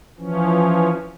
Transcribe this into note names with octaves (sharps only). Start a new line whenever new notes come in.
E3 F3 C#4